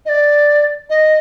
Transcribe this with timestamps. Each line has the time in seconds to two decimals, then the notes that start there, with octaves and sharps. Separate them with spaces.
0.06 D#5
0.09 D5
0.90 D#5